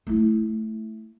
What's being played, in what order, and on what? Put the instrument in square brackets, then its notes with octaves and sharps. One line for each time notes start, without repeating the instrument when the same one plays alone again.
[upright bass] A3 E4